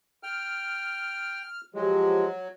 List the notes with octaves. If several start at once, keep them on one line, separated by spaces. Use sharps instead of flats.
G5 F6
F3 F#3 G#3 G4